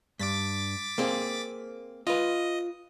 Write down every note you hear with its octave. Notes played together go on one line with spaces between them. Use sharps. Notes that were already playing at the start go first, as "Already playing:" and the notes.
G2 D6 A6 B6
A#3 C4 G#4
F4 B4 D#5